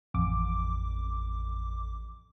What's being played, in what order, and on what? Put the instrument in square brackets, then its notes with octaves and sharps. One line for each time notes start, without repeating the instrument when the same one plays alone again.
[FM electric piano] A1 F2 D6